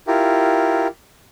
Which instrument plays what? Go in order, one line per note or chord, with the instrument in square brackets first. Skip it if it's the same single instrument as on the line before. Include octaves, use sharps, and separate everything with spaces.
[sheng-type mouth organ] E4 F4 G4 A#4